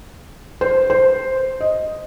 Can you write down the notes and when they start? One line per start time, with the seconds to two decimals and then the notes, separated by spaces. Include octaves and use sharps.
0.61 C5
0.90 C5
1.61 D#5